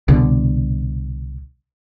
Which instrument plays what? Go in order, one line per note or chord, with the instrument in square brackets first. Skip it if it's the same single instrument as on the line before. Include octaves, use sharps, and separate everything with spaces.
[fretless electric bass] C2 B2 D3